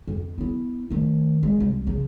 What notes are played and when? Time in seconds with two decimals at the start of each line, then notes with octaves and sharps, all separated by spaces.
0.07 F2
0.38 B3 E4
0.90 D#3 A3
1.43 G#3
1.60 C2
1.87 C#3 F3